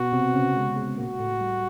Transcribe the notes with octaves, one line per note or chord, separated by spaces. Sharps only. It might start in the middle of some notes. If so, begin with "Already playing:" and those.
Already playing: B2 B3 F#4
C3 C4
C#3 C#4
G#3
G#3
A#2 A#3 F#4
A2 A3
G3